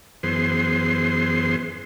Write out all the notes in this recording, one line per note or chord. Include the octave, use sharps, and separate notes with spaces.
F#2 E3 B3 G#4 C5 C6